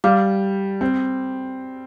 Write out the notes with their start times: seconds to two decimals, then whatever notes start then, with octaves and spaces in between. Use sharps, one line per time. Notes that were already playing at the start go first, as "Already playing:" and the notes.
0.04 G3 F5 D6 F6
0.81 C4